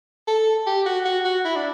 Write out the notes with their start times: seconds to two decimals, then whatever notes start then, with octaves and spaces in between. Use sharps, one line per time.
0.28 A4
0.67 G4
0.86 F#4
1.05 F#4
1.25 F#4
1.45 E4
1.56 D4